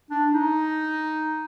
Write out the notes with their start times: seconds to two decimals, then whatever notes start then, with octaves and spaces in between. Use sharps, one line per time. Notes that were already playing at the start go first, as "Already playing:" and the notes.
0.11 D4
0.34 D#4